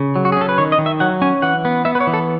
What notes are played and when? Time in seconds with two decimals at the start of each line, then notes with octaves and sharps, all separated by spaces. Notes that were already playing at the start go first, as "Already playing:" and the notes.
Already playing: C#3
0.16 F#3
0.25 F#4
0.32 G#4
0.37 C#4 A4
0.49 B4
0.58 D#3 C#5
0.72 D#5
0.78 D#3
0.86 E5
1.00 F#3 F#5
1.22 C#4 G#5
1.42 E3 F#5
1.65 B3
1.85 B3 E5
1.95 B4
2.00 C#5
2.07 E3
2.13 A4